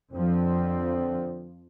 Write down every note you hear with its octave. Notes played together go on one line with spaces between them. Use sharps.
F2 D3 F3 C4